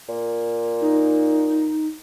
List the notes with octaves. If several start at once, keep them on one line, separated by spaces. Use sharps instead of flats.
A#2
D#4